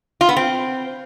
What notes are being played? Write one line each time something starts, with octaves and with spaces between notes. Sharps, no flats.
F4
B3
C4